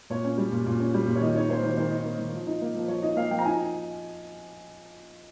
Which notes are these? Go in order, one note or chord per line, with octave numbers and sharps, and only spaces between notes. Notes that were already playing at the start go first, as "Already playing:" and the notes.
A#2 C#5
C#4
G3
A#2
A#2
C#4
G3
A#2
C#5
D#3 D#5
D#4 C#5
A#3 C5
D#3 C5
D#3 C5
D#4
A#3
D#3
F3
D#4
A#3
F3
F3 C#5
D#4 D#5
A#3 F5
F3 G5
A#5
D#4 G#5